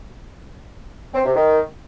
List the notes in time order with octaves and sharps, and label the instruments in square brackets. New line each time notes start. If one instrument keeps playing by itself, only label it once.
[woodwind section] C4
C3
D#3